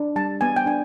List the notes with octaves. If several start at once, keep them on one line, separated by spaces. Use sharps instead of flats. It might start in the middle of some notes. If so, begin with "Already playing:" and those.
Already playing: D4
G3 A5
B3 G#5
G5
D4 G#5